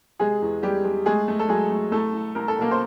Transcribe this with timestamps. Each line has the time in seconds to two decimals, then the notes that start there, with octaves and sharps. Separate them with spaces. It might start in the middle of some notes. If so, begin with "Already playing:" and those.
0.19 C3 G#3 G#4
0.42 E2
0.63 G3 G#3 G4
0.84 G#3
1.06 G#3 A3 G#4
1.28 A3
1.39 A4
1.48 F#3 G#3 G#4
1.71 A3
1.92 C2 A3 A4
2.14 C2
2.35 C2 A#4
2.48 A4
2.57 B2 A#3 A#4
2.71 C5